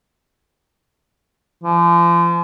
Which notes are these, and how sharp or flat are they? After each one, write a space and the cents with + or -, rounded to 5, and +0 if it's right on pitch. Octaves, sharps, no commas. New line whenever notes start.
F3 -35